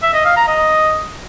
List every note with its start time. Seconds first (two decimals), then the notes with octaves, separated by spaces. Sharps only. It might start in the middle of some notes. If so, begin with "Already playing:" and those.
0.02 E5
0.14 D#5
0.25 F5
0.36 A#5
0.48 D#5